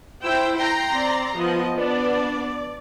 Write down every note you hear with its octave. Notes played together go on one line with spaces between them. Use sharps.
E4 C5 G5 E6
G5 A#5 C6
C4 D5
F3 B3 D#5
B3 D4 D5